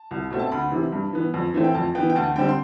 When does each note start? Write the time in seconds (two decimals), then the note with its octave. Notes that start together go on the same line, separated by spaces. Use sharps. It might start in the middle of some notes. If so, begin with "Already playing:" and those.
Already playing: A5
0.11 C2
0.30 B2 A3 C4
0.39 A5
0.51 D2 B5
0.72 C3 E3
0.92 G2
1.13 E3 B3
1.34 F2
1.54 E3 A3 C4
1.64 G5
1.74 F2 A5
1.95 E3 B3 G5
2.10 G5
2.15 D2 A5
2.36 D3 G3 C4 G5
2.49 C6